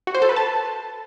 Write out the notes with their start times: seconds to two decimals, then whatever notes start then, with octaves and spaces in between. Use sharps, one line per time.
0.07 F#4
0.15 C5
0.22 A4
0.29 B4
0.36 A5